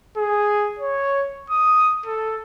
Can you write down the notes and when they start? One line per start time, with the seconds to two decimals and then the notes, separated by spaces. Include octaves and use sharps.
0.17 G#4
0.79 C#5
1.50 D#6
2.06 A4